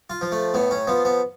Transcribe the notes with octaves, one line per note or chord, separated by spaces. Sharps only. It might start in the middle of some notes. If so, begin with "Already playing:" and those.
F4
F3
A3
A2 B3
C#4
F3 B3
B3